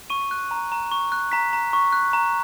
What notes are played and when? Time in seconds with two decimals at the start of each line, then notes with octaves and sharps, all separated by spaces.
0.10 C#6 D#7
0.31 F#6
0.51 A#5
0.72 A#5
0.91 C#6
1.12 F#6
1.32 A#5 B6
1.53 A#5
1.73 C#6
1.93 F#6
2.13 A#5